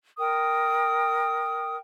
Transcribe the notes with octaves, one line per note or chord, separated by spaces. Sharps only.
A#4 G5 D#6